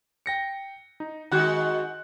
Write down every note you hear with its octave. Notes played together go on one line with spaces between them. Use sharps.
G5 A#6 C#7
D#4
D#3 G#3 F#4 F#5 F#6 G6